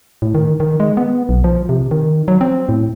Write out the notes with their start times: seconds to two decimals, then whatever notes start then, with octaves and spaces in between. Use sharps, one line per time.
0.22 A2
0.35 D#3
0.60 D#3
0.80 G#3
0.97 B3
1.29 B1
1.44 F3
1.69 C3
1.91 D#3
2.28 F#3
2.41 C4
2.69 A2